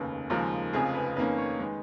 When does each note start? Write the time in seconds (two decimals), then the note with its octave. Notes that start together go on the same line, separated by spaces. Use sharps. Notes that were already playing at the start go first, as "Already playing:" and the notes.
Already playing: F1 D#2 C#3 B4
0.30 D#2 C#3 F3 G#3 A#4
0.73 F1 F2 C#3 F3 G#4
0.94 B4
1.17 F2 D#3 A#3 C#4 B4
1.38 C#5
1.59 D#3 G#3 B4